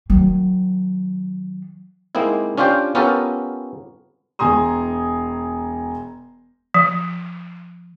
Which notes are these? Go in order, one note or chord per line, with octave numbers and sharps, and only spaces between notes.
D#3 F#3
G#3 A#3 C4 D#4 E4
C#4 D4 F4 G4 C5 G5
B3 C#4 F4 G4 A4 A#4
E1 G#5 A#5 C6 D#6
F3